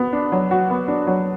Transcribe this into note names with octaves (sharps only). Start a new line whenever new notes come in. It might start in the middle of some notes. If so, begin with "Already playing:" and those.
Already playing: B3
D4
F#3
F#4
B3
D4
F#3